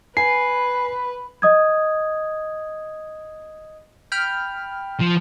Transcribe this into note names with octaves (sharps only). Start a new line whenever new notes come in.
B4 G#5 C7
D#5 D#6 G#6
G5 B5 F6
F3